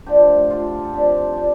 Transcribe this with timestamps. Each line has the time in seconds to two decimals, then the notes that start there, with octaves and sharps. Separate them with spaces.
0.06 D3 F3 A3 D4 G4
0.50 F4 A4
0.84 A4
0.93 G2 F3 C4 D4 G4
1.32 F4
1.37 D4 G4